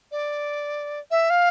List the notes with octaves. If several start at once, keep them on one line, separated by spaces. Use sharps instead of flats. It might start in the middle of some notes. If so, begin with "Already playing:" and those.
D5
E5
F5